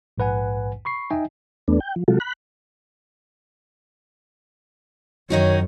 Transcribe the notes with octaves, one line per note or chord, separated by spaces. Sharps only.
A#1 G#2 B4 F#5 G#5
B5 C#6 C7
D#4 D#5 E5 G5 G#5
E2 A3 B3 D4
G5
F3
C3 F#3 G#3 F4 F#4 A4
B5 F#6
F#2 D#3 D#4 F#4 C#5